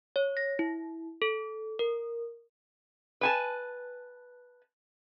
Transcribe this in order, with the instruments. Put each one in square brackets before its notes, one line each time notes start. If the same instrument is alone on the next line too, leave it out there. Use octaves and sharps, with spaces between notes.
[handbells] C#5
A#6
E4
A4
A#4
[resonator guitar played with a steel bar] B4 G#5 A5